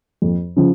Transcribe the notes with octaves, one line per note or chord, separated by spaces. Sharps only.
F2
C#3 F3